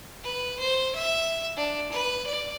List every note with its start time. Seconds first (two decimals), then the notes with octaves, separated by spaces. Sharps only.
0.23 B4
0.59 C5
0.95 E5
1.56 D4
1.92 B4
2.26 D5